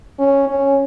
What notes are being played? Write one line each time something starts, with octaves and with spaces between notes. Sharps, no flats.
C#4
C#4